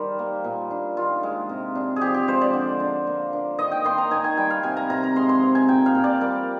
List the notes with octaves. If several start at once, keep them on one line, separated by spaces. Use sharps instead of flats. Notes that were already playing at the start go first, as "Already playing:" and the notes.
Already playing: D#3 G3 A#4 C5 D5
A#3
A#2
D4
D#3 F4
G#3
C3
D4
G#4
F3 G4
G4
G#3 C5
D5
D3
D4
A#3
D4
D#3 D#5
G5
D#3 C6
A#5
D#3 G#5
G#5
G3 G5
F5
C3 G#5
A#5
C3 A#5
A#5
G#3 C6
C6
C4
G#5
A#2 G5
F5
A#2
D5
G3 A#4